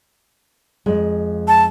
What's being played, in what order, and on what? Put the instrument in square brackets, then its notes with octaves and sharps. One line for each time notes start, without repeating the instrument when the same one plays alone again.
[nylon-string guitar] F2 G#3
[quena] A5